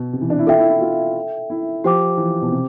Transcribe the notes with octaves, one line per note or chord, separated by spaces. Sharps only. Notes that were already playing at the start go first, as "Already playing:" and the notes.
Already playing: B2
C3
E3
D4
E4
F4 A4 E5 G5
E4
E4
F4
E4
F3 G4 C5 G5 D6
E3
B2
C3